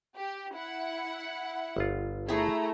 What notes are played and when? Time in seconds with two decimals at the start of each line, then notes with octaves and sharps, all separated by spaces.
0.17 G4
0.56 E4 F#5
1.76 G1 F4
2.28 A3 E4 G#4 A#5